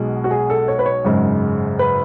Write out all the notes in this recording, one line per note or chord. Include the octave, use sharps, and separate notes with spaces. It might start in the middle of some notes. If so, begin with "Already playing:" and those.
Already playing: B1 B2 G#3
F#4
G#4
A4
C#5
B4
C#5
G#1 F#2 C#3 G#3
B4